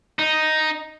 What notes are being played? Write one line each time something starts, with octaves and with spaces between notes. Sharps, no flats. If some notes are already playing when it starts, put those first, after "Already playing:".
D#4